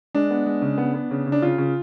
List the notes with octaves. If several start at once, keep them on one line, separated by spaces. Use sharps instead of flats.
G#3 D4
B3
G#3
C#3
B3
B3
C#3
C#3
D4
C#3 F4
C#3